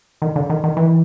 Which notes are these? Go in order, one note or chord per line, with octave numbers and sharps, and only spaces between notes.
D#3
D3
D#3
D#3
E3